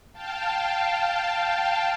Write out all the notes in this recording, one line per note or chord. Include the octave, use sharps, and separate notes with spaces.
F5 G5 A5